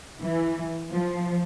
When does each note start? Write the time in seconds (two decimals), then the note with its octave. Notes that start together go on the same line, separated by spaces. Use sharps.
0.22 E3
0.91 F3